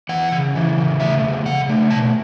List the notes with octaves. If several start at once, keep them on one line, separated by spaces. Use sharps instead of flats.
E3 F#5
C#3
E3
C#3
A3 E5
C#3
C#3 F#5
A3
B2 A5